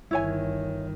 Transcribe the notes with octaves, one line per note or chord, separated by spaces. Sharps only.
G1 D#3 E4 C#5 G#5